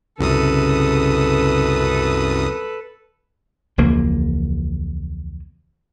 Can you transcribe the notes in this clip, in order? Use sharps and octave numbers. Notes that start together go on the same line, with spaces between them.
C2 F#2 C#3 A4 B4 D#6
E1 C#2 F3 A#3